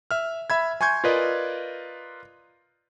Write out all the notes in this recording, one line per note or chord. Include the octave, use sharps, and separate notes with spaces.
E5 F6
E5 B5 G#6
G#5 C6 C#6 G6 G#6
F4 A#4 B4 D5 D#5